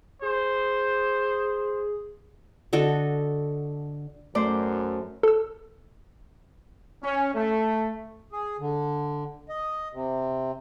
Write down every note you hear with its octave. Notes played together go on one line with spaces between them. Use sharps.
G#4 C5
D3 F#4 A4 D#5
F#2 A3 C5 D5
A4 E6
C#4
A3
G#4
D3
D#5
C3